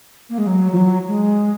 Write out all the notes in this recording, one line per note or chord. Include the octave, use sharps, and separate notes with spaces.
A#3
G#3
F#3
F3
F#3
G#3